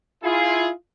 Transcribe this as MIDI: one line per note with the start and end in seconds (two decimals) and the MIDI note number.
0.23 0.70 64
0.23 0.70 65
0.23 0.70 68